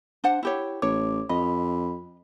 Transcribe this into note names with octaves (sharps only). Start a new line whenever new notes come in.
D4 C5 F#5
E4 G4 C#5
A1 C#5 D6
F2 D#5 B5